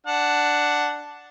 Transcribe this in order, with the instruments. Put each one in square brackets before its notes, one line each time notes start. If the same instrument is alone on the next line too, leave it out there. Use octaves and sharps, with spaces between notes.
[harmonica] D4 F#5